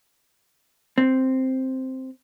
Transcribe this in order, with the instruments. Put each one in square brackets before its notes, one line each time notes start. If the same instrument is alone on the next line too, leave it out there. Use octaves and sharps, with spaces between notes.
[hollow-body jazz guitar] C4